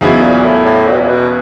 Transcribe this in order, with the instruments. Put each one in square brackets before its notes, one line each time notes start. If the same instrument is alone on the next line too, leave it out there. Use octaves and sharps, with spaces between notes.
[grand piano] E2 C#3 F#3 B3 E4 [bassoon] G#2
[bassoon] A#2
A2
A2
A#2
B2
A#2
B2